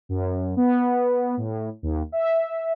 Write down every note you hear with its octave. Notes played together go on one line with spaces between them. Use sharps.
F#2
B3
A2
D#2
E5